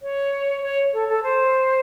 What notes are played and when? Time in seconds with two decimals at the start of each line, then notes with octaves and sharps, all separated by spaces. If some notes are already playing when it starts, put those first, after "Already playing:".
0.02 C#5
0.63 C#5
0.93 A4
1.08 A4
1.23 C5